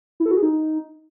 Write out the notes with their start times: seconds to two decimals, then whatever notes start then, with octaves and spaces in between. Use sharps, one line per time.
0.20 E4
0.26 A4
0.31 F#4
0.37 G#4
0.43 D#4